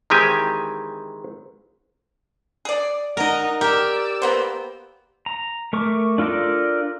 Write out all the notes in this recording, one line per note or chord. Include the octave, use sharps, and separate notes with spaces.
D#3 E3 G#3 C4 G4 G#5
G#4 D5
D#4 A#4 D#5 F#5
G4 A#4 D5 E6
A#3 B3 C5
A#5
A3 A#4 C#6 D6
D4 F4 A4 A#4 D5